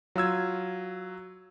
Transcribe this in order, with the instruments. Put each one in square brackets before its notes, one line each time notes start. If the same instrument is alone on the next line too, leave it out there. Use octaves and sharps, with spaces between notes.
[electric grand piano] F#3 F4 E6 G#6